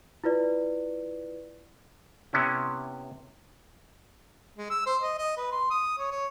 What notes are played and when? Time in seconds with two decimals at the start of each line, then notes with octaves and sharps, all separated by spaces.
0.24 E4 F4 B4 D5
2.33 C3 B3 C#4 E4
4.57 G#3
4.70 E6
4.86 C5
5.02 D#5
5.18 D#5
5.37 B4
5.52 C6
5.71 D#6
5.98 C#5
6.11 C#5